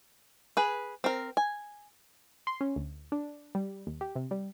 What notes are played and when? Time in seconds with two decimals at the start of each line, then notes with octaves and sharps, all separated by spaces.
0.57 G#4 B4
1.04 C4 A#4
1.37 G#5
2.47 C6
2.61 C#4
2.76 D2
3.12 D4
3.55 G3
3.87 D#2
4.01 G4
4.16 C3
4.31 G3